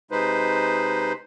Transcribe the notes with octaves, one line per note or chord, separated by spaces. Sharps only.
C3 G#3 D#4 B4 C5